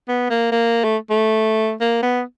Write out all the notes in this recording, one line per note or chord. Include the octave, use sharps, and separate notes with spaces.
B3
A#3
A#3
A3
A3
A#3
B3